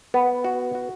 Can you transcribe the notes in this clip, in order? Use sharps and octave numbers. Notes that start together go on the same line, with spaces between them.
B3
F#4
F#4